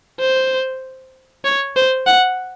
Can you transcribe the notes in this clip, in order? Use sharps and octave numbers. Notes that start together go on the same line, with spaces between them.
C5
C#5
C5
F#5